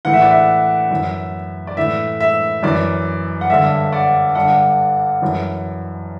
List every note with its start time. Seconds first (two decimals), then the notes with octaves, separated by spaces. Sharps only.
0.05 A2 E3 F#5
0.13 E5
0.22 D5
0.31 E5
0.91 F#2 E3
1.67 D5
1.77 A2 E3 E5
2.21 E5
2.63 F#2 E3 D5
3.41 F#5
3.49 G2 D3 E5
3.92 D5 F#5
4.35 G2 D3 D5 F#5
5.22 F#2 E3